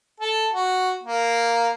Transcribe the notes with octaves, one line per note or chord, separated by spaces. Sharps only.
A4
F#4
A#3